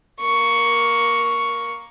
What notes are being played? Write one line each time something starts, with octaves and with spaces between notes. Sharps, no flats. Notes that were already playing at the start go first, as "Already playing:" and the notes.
A#3 C#6